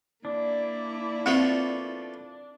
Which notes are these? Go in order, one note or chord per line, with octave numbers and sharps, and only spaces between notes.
A#3 D4 E4
F3 A3 B3 C4